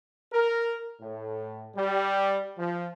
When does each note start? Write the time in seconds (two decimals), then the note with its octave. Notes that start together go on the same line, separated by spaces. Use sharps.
0.33 A#4
1.01 A2
1.76 G3
2.58 F3